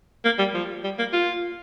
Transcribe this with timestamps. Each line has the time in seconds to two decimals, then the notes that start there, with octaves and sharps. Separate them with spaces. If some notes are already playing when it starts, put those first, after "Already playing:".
0.25 A#3
0.39 G3
0.54 F3
0.84 G3
0.99 A#3
1.13 F4